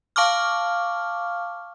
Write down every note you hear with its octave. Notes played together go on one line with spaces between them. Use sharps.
F5 A5 C#6 D6 F6